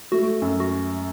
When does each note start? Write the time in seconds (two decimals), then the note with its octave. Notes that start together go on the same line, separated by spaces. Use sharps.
0.12 A3 F#4
0.42 F#2
0.60 F#4